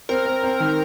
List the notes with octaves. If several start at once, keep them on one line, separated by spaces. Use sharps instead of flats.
C4 A#4
C4
C4
D#3